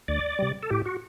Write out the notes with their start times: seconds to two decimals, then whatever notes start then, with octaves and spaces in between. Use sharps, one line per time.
0.08 D2 D5
0.39 C3 G3
0.63 A4
0.70 A2 G4
0.86 F#4